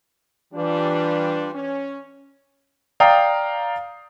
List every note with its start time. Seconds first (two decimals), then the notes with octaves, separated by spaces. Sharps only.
0.53 E3 G3 D4 F4
1.54 C#4
3.00 D5 F5 G5 A#5 D#6